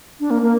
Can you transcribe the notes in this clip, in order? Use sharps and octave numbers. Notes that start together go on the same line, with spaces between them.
D4
A#3
A#3